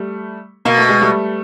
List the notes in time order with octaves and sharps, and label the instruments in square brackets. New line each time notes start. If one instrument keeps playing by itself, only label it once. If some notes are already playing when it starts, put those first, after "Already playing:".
Already playing: [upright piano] G3 A3
[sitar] B2 [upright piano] A#3
[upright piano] A3
G#3
G3 A3